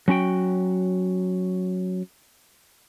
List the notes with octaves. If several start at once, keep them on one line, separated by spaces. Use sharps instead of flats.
F#3 C#4 F#4 G5